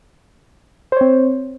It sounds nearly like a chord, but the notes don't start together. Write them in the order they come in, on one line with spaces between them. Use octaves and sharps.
C5 C#5 C4